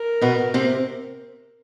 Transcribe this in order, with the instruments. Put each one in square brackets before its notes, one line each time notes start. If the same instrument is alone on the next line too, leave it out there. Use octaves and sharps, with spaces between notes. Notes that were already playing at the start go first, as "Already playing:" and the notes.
Already playing: [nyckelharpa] A#4
[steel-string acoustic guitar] B2 B3
C3 C4